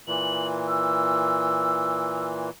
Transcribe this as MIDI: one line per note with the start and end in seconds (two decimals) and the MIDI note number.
0.07 2.50 46
0.07 2.50 52
0.07 0.46 102
0.68 2.26 88